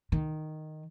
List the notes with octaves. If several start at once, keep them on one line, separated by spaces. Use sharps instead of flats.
D#3